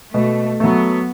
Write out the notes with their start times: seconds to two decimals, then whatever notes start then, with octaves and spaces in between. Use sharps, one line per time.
0.14 B2 A3
0.60 F#3 A3 B3